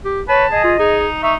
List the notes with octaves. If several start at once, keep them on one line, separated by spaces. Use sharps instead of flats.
G4
B4 C#5 A5
G#4 D#5
F4
D#4 G#4
D#4 E5 C#6